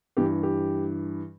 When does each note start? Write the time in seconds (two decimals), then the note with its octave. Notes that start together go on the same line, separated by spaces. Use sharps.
0.17 G2 E3 G4
0.43 G4